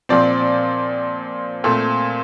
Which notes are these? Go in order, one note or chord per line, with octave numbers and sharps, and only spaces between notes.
A#2 F3 C4 D5
A#2 A3 C4